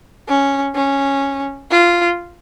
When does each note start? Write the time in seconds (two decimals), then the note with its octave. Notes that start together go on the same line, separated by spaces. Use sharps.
0.28 C#4
0.75 C#4
1.71 F4